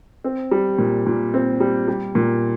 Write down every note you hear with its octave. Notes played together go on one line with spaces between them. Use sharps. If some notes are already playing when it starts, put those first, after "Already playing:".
C4
G3
A#2
A#2
C4
G3
G3
A#2